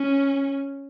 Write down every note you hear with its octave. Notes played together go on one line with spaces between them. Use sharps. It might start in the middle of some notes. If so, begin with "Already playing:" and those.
Already playing: C#4